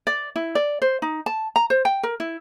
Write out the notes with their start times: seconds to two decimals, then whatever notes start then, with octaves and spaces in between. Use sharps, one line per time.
0.07 D5
0.36 E4
0.55 D5
0.82 C5
1.02 D#4
1.26 A5
1.56 A#5
1.70 C5
1.85 G5
2.03 A#4
2.20 E4